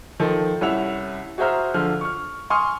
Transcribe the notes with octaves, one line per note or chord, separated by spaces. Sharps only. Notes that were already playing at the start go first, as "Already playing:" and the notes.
D#3 F3 A4
C2 C#4 E4 F#5 E6 F7
F#4 G#4 C5 E5 A#5 F6
D3 F3 F6
C#6 F6
G#5 C6 C#6 D#6 F6